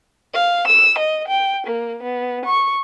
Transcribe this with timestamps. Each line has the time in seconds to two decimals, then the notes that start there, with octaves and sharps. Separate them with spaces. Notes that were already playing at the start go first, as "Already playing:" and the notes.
0.34 F5
0.66 E6
0.98 D#5
1.27 G5
1.66 A#3
2.02 B3
2.45 C#6